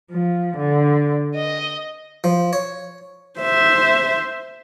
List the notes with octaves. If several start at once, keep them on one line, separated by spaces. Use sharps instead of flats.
F3
D3
D#5
F3
C#5
C5 E5